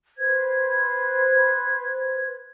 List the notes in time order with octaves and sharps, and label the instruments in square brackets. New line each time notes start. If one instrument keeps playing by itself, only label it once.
[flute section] B4 C5 G#6